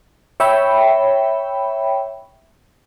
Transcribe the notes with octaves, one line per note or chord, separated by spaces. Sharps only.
C#5 E5 G5 B5